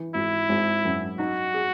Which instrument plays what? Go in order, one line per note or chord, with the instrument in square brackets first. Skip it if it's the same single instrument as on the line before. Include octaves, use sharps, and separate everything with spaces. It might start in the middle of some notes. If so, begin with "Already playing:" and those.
Already playing: [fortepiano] E3
[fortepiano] G#1 [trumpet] E4
[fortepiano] G#1
F#2
[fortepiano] D#4 [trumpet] F#4
[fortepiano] G#4